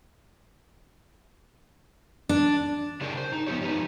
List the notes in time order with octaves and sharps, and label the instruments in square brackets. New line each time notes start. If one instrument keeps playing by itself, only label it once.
[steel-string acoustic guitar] D4
[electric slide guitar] C#3 C4 D4 G4 G#4 A#4
C5
D#4
F3 B3 F4 G4 C#5
F3 D#4 G4 B4